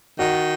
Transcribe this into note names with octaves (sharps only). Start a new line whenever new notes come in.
D#3 F#4